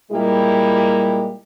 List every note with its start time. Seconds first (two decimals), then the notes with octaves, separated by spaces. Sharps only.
0.12 A#2 G3 G#3 A#3 E4 G4